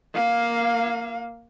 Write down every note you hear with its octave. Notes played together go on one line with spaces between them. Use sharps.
A#3 F5